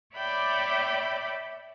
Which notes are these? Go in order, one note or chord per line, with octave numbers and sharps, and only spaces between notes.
C#5 D5 E5 G5 B5 D6